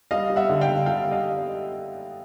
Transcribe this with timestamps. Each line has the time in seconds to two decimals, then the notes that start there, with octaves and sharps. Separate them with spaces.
0.11 G3 D#5 F5
0.30 G3
0.36 E5 F#5
0.49 D3
0.61 F5 G5
0.68 D3
0.86 G3 F5 G5
1.05 G3
1.11 D#5 F5